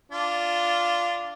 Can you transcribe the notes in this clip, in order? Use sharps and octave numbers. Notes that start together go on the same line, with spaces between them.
D4 F4